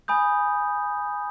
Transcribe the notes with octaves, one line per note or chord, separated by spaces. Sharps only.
G#5 B5 D#6 G6